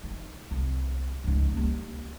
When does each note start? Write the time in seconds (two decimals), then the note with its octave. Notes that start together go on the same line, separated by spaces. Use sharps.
0.03 D#3
0.51 C2
1.24 C#2 G#2
1.53 D#2 G3